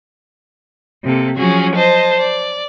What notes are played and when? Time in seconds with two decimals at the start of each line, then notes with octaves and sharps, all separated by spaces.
1.03 C3 A#3 A4
1.36 F3 F#3 C#4 F#4 G#4
1.74 C5 D#5 A5
2.19 D5